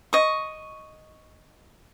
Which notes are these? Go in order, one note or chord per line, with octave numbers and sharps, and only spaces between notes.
D#5 C#6